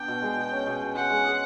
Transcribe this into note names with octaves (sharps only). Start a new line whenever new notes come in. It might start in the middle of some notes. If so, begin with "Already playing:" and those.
Already playing: B3 D4 G5
B2
G#3
B2
C#4
B2
B2
G#3 F#5
G#3
G#4